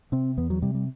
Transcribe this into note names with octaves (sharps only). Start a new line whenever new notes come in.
C3 C4
E2 B3
F#3
C3 G3
G3